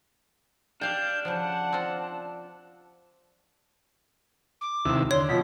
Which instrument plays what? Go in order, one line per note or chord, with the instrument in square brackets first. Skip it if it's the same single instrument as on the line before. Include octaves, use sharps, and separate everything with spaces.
[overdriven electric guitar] D4 [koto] G4 F5 G5 [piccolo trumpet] F6 [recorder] G6
[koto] C#3 F3 [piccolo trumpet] F#5 [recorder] A5
[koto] C4 F4
[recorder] D6
[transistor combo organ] D#2 C3 E4
[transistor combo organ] D3 [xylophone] C#5 [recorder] C6
[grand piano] B2 F3 [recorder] B6